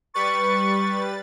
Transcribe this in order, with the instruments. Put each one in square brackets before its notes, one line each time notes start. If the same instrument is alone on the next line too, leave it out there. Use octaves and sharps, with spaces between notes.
[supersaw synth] G3 B4 A6 [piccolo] C#6